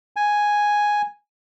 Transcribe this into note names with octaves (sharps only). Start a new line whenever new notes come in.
G#5